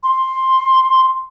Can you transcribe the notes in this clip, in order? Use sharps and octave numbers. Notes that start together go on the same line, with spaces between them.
C6